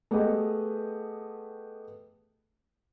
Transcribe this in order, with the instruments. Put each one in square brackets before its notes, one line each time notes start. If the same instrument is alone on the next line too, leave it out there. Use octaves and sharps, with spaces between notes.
[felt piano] A3 B3 G4 G#4 B4 D#5